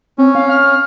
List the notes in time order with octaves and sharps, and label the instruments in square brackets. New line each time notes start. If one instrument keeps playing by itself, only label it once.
[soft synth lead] C4 [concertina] C#4
[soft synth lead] F5
F6